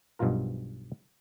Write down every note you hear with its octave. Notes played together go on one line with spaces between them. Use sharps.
B1 G2 B2 F3 F4 A#4